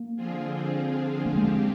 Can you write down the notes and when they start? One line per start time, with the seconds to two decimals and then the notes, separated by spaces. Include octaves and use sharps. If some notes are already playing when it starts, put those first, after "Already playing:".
Already playing: A#3
0.16 D3 F3 C4 F4 G#4
1.26 A#3
1.36 F3 G#3 C4 G4